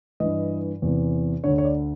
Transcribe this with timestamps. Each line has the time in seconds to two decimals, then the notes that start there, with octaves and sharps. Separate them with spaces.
0.20 G2 E3 D#5
0.82 E2 C3 E3
1.44 D2 D3 C#5
1.58 C#5
1.65 D5